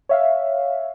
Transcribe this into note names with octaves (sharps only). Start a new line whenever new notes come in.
C#5 E5 F5